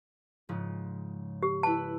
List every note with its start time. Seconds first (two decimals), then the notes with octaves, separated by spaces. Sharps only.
0.49 G#2 C#3 F3
1.43 G4
1.63 E4 B4 A5